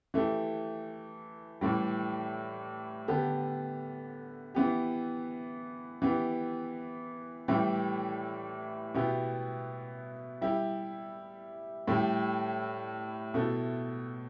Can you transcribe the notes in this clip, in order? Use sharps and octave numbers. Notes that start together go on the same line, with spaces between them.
E3 A3 G4
A2 E3 G3
D3 B3 G4
E3 B3 G4
E3 B3 G4
A2 E3 G3 E4 G4
B2 B3 E4 G4
G3 E4 G4
A2 G3 E4 G4
B2 A3 E4